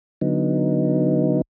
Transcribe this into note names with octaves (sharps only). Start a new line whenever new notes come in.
D3 F#3 B3 D#4